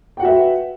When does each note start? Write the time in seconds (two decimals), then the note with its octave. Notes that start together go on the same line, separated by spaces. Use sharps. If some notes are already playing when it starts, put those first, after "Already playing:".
0.17 G5
0.20 F#5
0.22 F#4
0.25 E5
0.27 B4